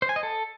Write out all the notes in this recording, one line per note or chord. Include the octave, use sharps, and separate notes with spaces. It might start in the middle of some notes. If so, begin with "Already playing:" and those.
C5
G#5
D#5
A4